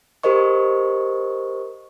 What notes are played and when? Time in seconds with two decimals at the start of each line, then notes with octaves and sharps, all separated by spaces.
0.23 G4 A#4 C5 D#5 C#6